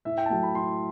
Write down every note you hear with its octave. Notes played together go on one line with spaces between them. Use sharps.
A2 E5
G5
A5
F#3 A3 G5
B5
A2 C6